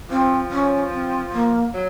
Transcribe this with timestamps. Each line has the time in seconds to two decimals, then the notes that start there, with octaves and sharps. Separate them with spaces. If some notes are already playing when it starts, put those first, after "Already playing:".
0.10 F3 C4
0.51 C#4
0.91 C4
1.32 A#3
1.74 F#3